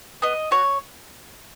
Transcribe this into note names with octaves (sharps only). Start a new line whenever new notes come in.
B3 D#5
F#4 C#5